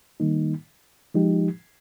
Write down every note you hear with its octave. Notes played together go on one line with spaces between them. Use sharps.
D#3 G3 A#3 D#4
F3 G#3 D#4 G4